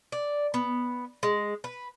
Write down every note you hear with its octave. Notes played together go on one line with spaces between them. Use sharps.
D5
B3
G#3
B4